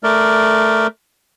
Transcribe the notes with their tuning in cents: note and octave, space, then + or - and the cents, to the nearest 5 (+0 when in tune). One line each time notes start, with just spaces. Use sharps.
A3 +0 A#4 +0 D5 +0